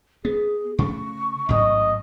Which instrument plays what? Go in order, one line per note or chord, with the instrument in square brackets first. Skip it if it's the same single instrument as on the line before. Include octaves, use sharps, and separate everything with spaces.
[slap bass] B3 [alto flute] G#4
[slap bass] C#3 A3 [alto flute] C#6
[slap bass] A1 G#2 F#3 [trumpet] D#5